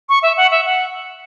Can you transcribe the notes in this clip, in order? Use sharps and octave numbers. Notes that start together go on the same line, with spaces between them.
C#6
E5
F#5
E5
F#5